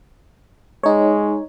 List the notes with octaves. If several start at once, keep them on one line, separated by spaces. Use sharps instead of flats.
G#3 D#4 C#5